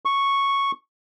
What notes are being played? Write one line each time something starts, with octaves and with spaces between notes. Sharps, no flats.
C#6